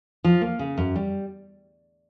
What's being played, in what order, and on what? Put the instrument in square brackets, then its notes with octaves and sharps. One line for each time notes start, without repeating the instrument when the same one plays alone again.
[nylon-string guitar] F3
A#3
C#3
F#2
G3